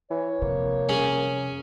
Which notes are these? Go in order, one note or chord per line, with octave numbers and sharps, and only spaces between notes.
E3 C#5
F2 C3 A#3
C#4 G#4